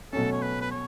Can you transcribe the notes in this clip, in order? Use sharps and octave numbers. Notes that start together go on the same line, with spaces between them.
B2 F#3 A3 C#4 A4
C#5
B4
B4
C#5